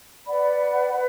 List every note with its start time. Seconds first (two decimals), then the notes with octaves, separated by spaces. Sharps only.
0.24 B4 D5 F#5 B5
0.93 B4